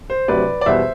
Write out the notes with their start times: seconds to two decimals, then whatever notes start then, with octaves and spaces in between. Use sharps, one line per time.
0.10 C5
0.28 D2 C3 F#3 B4 D5
0.61 D5
0.66 E2 B2 G3 B3 C5 E5